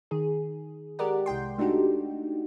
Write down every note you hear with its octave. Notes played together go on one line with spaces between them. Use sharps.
D#3 G#4
G#3 G4 A#4 D5 F#5
C2 G#3 G5 C6
A3 D4 D#4 F#4 G4